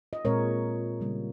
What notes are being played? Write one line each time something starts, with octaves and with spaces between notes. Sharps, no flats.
D#5
A#2 G#3 C4 A#4 C#5
C#3 G3 A#3